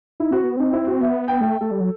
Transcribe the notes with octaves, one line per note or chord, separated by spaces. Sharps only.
D#4 E4
C4 F#4
B3
C4 D#4
E4
F#4
B3 E5
G5
A3 G5
A3 A4
G3
F#3